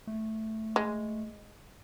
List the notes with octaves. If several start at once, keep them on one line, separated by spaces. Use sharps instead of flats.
A3
G#3